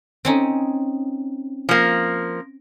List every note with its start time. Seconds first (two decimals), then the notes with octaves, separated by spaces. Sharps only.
0.25 C4 C#4 D#4
1.69 F3 A#3